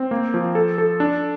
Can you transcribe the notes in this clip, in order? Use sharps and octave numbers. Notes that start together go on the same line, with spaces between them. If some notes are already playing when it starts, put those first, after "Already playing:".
Already playing: C4
A#3
F3
A4
A4
D4